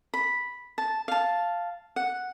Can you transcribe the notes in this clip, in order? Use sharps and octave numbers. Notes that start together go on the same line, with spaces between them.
B5
A5
F5 A5
F#5